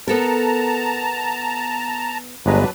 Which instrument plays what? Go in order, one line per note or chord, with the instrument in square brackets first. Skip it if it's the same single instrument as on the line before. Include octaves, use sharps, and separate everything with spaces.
[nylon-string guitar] B3 A4 A#4 [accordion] A5 A#5
[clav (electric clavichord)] G1 G#3 A#5 [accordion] F#3 D4 B4